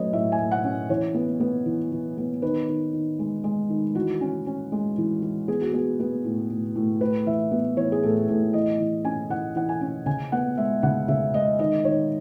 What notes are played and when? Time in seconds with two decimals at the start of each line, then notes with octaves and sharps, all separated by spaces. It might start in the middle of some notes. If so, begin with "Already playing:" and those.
Already playing: F#3 A3 C#4 B4 C#5 D#5
0.13 A2 E5
0.32 G#5
0.38 A3
0.51 F#5
0.64 C#4
0.89 E3 C#5
1.14 B3
1.40 B3
1.66 E3
1.92 E3
2.18 B3
2.42 D#3 B4
2.69 D#3
2.93 D#3
3.19 G#3
3.44 G#3
3.70 D#3
3.95 E3 F#4
4.21 C#4
4.46 C#4
4.72 G#3
4.98 E3
5.22 E3
5.48 B3 G#4
5.61 F#4
5.73 B3 G#4
6.00 B3
6.25 A2
6.50 A2
6.75 A2
7.01 A2 B4
7.26 E3 E5
7.52 B3
7.77 E3 C#5
7.92 G#4
8.03 A2 A4
8.29 A2 A4
8.53 E3 D#5
8.79 E3
9.05 C#4 G#5
9.30 E3 F#5
9.56 E3 F#5
9.69 G#5
9.81 C#4
10.06 C#3 G#5
10.32 B3 F#5
10.57 G#3 E5
10.83 C#3 F#5
11.08 C#3 E5
11.34 G#3 D#5
11.59 D#3 D#5
11.85 D#3 C#5